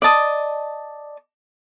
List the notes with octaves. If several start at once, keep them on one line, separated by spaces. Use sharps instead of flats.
D5 D#5 A5 D#6